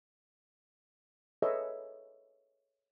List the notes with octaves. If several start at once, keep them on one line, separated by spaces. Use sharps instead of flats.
G#4 A4 B4 C#5 D#5 E5